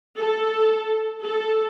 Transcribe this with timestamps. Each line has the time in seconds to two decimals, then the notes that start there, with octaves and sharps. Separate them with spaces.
0.17 A4
1.23 A4